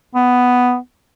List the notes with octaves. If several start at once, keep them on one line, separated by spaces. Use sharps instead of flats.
B3